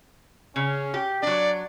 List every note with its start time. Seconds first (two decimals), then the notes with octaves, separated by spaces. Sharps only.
0.56 C#3 C#4
0.94 G4
1.22 F#3 D4 D5